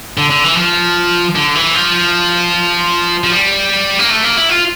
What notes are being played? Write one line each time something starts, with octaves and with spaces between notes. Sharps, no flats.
D3
D3
E3
F3
D3
E3
F3
F3
G3
A#3
A3
A#3
E4
F4